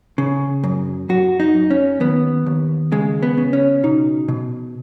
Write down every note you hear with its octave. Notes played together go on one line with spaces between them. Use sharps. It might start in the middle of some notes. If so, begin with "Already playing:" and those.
C#3
F#2
F#2 F#4
D#4
F#2
C#4
D#2 B3
D#2
C#3 G#3
B3
C#3
C#4
B2 D#4
B2